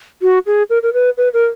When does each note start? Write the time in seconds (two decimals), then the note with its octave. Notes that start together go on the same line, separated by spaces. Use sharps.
0.22 F#4
0.46 G#4
0.70 A#4
0.83 A#4
0.93 B4
1.17 B4
1.33 A#4